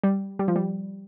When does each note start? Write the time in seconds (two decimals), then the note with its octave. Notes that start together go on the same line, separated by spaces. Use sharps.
0.04 G3
0.39 G3
0.48 F3
0.56 G3